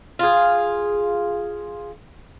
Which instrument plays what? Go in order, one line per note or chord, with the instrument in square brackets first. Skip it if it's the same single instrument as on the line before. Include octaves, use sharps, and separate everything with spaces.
[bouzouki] F4 G#4